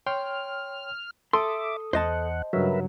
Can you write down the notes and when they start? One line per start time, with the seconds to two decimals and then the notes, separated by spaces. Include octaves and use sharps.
0.06 C#5 G5 C6 F6
1.33 A4 E5 C6 D6 D#6
1.93 E2 C5 D#5 F#5 A5
2.53 G2 C#3 F#3 A#4 B4 E5